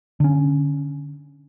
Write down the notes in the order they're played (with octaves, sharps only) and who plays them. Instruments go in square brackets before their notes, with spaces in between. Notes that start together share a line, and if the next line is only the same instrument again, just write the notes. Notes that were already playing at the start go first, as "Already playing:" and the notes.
[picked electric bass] D3 C#4